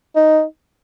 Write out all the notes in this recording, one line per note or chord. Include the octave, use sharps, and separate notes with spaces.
D#4